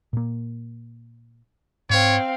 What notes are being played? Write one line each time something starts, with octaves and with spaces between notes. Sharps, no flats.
A#2 A#3
G#2 C4 C#5 F5